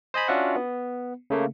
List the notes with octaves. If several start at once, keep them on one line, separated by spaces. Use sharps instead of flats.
C5 D#5 G#5 B5
C#4 D4 F4 F#4 E5 F#5
B3
C#3 A3 A#3